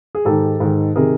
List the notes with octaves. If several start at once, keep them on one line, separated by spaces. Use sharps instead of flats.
G#4
G#2 D#3 G4 A4
G#2 D#3
C3 D#3 G#4 A#4